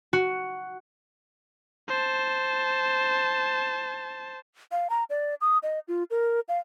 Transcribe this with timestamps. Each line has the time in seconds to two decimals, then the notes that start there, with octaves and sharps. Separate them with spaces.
0.13 F#4
1.89 C5 A5
4.72 F5
4.90 A#5
5.10 D5
5.41 D#6
5.63 D#5
5.88 F4
6.11 A#4
6.49 F5